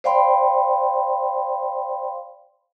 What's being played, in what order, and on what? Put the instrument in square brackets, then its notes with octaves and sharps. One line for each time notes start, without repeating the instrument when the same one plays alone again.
[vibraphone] C5 D5 F5 G5 B5 C6